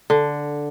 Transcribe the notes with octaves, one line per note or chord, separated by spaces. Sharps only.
D3